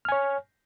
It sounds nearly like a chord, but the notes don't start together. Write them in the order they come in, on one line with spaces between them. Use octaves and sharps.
F6 G#5 C#5